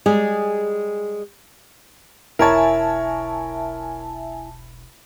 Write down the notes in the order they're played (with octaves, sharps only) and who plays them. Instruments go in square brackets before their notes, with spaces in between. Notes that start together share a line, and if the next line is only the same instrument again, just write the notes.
[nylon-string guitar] G3 G#3 G4 G#4
[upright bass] E1 B1 [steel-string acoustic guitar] E4 [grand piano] A#4 C#5 [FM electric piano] E5 G#5 A5